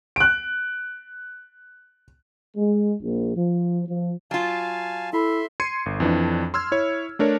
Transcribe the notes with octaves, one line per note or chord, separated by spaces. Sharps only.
F#6 D7
G#3
A#1
F3
F3
F#3 F4 F5 G#5 A5
E4 A4 E5 B5 C6
C6 G#6 C7 C#7 D#7
G1
F2 E3 D4
C6 E6 F6 G#6
E4 C#5 E6
A3 D4 A#4 C#5